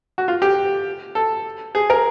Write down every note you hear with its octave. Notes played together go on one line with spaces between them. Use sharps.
F#4
F4
G4
A4
G#4
A#4